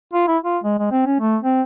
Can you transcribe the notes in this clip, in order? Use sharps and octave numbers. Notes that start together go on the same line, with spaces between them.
F4
E4
F4
G#3
G#3
C4
C#4
A3
C4